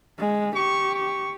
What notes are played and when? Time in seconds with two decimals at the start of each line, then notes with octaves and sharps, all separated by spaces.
0.19 G#3
0.56 G4 C#6
0.95 C#6